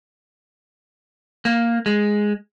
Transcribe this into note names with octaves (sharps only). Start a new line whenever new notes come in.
A#3
G#3